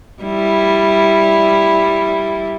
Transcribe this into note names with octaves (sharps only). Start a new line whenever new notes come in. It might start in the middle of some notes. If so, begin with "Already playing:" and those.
G3 E4